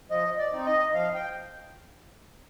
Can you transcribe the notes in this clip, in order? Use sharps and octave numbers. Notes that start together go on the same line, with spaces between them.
F3 D#5
D5
C4 D#4
D#5
F3 F5
G5